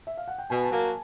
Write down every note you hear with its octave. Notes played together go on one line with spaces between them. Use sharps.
E5
F5
F#5
G5
B2 G#5
A5
F#3 A#3
A5